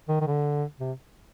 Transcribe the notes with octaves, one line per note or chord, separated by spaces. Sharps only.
D#3
D#3
D3
C3